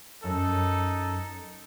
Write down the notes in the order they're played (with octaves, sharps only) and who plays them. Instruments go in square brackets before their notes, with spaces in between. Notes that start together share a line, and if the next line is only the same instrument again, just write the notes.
[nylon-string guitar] F#2 [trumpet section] D#4 A4